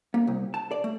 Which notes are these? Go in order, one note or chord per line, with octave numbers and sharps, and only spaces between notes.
A#3
C2
A5
D5
A3